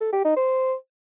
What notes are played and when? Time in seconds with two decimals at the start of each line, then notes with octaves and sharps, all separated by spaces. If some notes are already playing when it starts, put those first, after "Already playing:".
0.01 A4
0.13 G4
0.24 D#4
0.36 C5